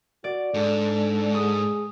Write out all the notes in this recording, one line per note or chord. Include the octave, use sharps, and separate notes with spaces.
F#4 D5
G#2 D4 A4
G#4 D#6